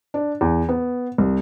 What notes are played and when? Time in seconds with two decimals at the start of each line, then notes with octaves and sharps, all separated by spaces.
0.14 D4
0.41 E2
0.69 B3
1.18 C2